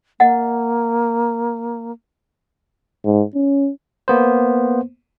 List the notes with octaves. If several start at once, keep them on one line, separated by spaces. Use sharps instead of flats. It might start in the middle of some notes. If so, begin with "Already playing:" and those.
A#3 D#5 F#5
G#2
C#4
A#3 B3 C5